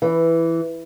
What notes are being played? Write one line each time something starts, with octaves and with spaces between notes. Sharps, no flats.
E3